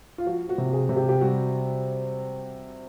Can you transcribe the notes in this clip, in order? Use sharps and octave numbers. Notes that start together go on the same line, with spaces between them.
F4
F3 F#4
F#4
C3
G#4
C3
G4
G4
G3 F#4